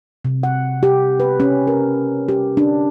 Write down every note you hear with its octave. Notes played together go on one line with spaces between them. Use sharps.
C3
F#5
G4
B4
C#4
A#4
G4
D4